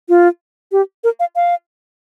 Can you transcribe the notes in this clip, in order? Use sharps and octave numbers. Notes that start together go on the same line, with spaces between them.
F4
G4
A#4
F5
F5